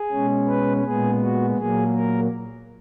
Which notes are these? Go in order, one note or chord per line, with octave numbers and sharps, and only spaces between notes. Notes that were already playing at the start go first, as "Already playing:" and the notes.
Already playing: G#4
B2 G#3 C#4
B4
A#2 G#3 B3 G#4
F#4
A#2 F#3 A#3 G#4
A#4